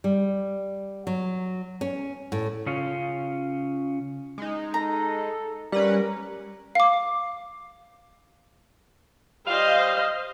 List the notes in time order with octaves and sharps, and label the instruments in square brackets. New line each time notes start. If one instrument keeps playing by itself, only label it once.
[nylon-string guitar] G3
F#3
C#4
A2
[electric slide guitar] C#3 C#4 F4
[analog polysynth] G#3 D#4
[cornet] A4 [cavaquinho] A#5
[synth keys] G3 [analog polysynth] C#4 B4 F#5 [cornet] A#4
[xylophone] F5 D6
[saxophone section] G3 F5 [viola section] C5 D#5